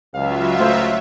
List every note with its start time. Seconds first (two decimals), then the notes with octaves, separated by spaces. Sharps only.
0.14 C#2 F#3 F4 E5 F5
0.60 A3 C5